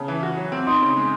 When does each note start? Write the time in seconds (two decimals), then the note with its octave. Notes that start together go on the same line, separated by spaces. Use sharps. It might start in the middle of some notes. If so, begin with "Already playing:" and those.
Already playing: C#3 A5
0.08 E3
0.23 F#4
0.37 F#3
0.52 C4
0.67 D#4 C6 D#6
0.81 C#3
0.97 G#3